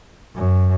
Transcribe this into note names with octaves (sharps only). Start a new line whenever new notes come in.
F#2